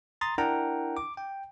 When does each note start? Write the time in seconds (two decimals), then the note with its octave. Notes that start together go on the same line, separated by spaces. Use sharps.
0.21 A#5 C6 D#6 A6
0.38 D4 E4 A#4 F#5 G5 A#5
0.97 D6
1.17 G5